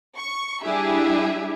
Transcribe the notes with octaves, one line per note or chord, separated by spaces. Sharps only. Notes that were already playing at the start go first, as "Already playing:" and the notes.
C#6
G3 D4 E4 G4 G#4 E5